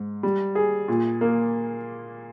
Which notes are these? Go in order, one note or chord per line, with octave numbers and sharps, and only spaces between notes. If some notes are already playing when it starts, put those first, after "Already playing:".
Already playing: G#2
G3
G#4
A#2
A#3